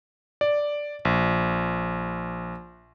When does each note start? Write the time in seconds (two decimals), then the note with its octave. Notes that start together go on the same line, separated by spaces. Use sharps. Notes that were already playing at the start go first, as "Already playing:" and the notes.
0.41 D5
1.05 A#1